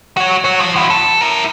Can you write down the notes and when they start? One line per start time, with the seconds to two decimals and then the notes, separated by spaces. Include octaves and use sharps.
0.17 F#4 C#5
0.44 F#4 C#5
0.60 F3
0.76 E4 F#4
0.90 A4
1.22 E4 A#4